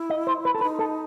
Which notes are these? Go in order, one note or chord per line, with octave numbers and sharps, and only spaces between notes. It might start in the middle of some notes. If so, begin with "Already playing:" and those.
Already playing: E4
D#5
C5
B4
A4
C4
D#4 B4
A4